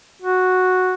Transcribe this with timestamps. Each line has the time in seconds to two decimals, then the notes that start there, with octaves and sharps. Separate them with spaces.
0.22 F#4